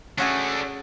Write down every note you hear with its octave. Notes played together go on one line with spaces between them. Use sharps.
A3 C#4 D4 F#4 G#4